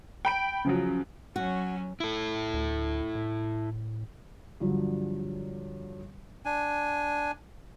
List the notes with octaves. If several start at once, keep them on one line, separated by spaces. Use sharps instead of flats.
G5 B5 D7
C#3 F3 F#3
F#3 C#4 F#4
E4 A4
D2
A2
G2 D3 F3 F#3
D4 G#5